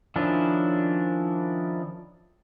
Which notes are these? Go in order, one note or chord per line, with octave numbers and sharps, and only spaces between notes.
D#3 F3 C#4 D4 E4